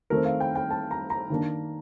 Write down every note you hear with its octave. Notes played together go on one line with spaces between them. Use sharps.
D#3 A3 C4 A#4
F5
G5
G5
A5
A#5
A#5
D#3 A#3 D4